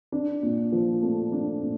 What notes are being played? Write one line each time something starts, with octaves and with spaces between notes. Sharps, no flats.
D4
A#2
F3
A3
D4
A#2